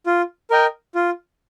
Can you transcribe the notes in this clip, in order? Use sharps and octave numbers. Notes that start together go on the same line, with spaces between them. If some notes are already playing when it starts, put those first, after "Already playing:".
F4
A#4 D#5 G5
F4